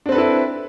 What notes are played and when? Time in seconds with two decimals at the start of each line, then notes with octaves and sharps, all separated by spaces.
0.06 D4
0.09 C4
0.12 B4
0.15 A4
0.18 E4